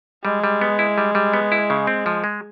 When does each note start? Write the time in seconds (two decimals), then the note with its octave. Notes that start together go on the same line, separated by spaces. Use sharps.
0.25 G3 G#3
0.44 G3
0.61 B3
0.79 E4
0.98 G3
1.15 G3
1.33 B3
1.52 E4
1.70 C#3
1.87 C4
2.06 F3
2.24 G#3